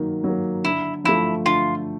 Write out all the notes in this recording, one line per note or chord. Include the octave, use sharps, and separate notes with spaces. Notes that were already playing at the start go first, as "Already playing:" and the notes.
Already playing: D#3 F#3 A#3
F#3 A#3
D3 E4
F3 A3 E4
D3 F4